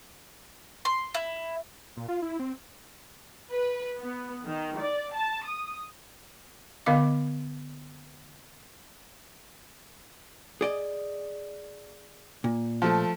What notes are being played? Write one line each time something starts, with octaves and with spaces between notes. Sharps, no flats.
C6
E4
A#2
F4
E4
C4
B4
B3
D#3
D5
A5
D#6
D3 B3 D#5 F5 D6
G#4 D5 D#5
A#2
F3 A3